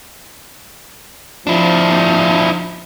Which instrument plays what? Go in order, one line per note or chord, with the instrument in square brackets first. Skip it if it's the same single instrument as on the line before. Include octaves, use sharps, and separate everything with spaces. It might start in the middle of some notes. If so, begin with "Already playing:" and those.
[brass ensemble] F3 [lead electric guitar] D4 E4